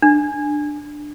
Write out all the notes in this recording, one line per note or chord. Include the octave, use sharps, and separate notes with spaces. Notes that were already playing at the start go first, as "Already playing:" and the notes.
D4